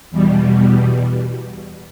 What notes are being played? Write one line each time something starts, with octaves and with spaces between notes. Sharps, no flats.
E2 B2 G3